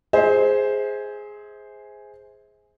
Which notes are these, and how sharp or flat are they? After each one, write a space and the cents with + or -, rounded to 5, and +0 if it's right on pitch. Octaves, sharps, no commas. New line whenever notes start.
G#4 +0 C5 +0 E5 -40